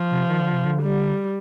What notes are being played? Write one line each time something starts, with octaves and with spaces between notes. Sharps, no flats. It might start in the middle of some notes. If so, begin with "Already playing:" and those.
Already playing: F3
C3
D#3
D3
C3
D3
G3